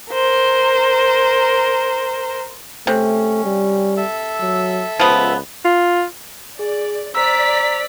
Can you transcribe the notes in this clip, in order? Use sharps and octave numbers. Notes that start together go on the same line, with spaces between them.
A#4 C5
C3 A3 C#4
G3
A4 E5
F#3
C#2 F3 B3
F4
G#4 D5
C5 D5 A#5 E6 B6